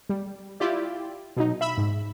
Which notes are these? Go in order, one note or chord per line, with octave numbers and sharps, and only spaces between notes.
G3
E4 F4 G4 D5
B2 F#3 D#4
E5 B5 E6
G#2